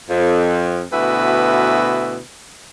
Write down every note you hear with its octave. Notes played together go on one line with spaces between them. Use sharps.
F2
D2 B2 E4 F#4 B4